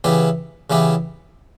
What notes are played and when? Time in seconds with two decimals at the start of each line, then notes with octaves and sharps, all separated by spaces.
0.04 C#3 E3 B3 E4 G4
0.70 C#3 E3 B3 E4 G4